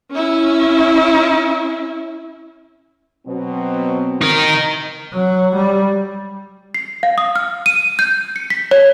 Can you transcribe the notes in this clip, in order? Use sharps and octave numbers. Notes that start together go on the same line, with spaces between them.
C#4 E4
B2 F#3 C4
D#4 A#4
F#3
G3
C7
F5
D#6
F6
D#7
G6
C#7
B6
C#5